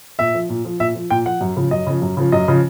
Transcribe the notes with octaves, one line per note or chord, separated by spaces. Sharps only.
A#2 E5
F3
A#2
F3
A#2 E5
F3
A#2 G5
F3 F#5
F#2
C#3 F3
F#2 D#5
C#3 F3
F#2
C#3 F3
F#2 D#5
C#3 F3